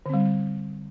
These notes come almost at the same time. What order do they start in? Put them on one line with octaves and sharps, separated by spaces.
D3 C4 G3